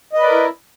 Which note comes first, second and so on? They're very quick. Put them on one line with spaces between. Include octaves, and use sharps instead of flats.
D#5 B4 D5 A#4 E4